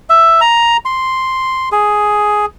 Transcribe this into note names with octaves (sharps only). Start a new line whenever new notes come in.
E5
A#5
C6
G#4